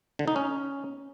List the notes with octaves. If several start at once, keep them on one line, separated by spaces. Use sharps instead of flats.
D3
D#4
C#4